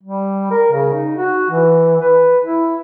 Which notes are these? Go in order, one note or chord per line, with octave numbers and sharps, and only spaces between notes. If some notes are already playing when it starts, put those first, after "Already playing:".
G3
A#4
C#3
D#4
F#4
E3
B4
E4